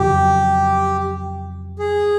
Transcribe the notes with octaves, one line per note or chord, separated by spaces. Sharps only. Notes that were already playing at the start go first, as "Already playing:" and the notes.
Already playing: F2 C#3 F#3 G4
G#4